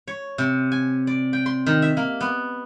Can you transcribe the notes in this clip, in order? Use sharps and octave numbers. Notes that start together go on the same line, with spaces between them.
C#5
C3
G#5
D5
G5
C6
D#3
E5
A#3
B3